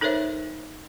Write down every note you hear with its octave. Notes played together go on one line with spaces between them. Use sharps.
D#4 A4 A#4 C5 C#5 E5